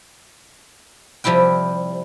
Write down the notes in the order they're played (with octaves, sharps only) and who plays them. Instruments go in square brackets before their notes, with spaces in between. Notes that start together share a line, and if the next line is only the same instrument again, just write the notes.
[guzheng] C3 F3 G3 E4 G5